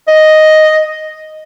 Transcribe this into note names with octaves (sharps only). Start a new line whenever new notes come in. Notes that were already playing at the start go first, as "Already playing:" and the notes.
D#5